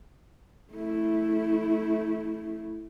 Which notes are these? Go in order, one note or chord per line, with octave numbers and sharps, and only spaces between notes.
A3 E4